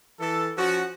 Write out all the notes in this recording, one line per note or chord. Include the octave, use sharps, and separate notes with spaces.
E3 A4
F3 C#4 F#4